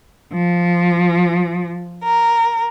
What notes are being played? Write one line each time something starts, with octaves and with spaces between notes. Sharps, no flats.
F3
A#4